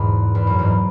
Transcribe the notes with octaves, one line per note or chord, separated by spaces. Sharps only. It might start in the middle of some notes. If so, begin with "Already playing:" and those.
Already playing: E2 G#2 B2 G#3
E2
F#2
E2 G#2